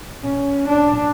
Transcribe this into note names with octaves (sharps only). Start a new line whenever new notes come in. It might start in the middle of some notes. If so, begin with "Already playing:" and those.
C#4
D4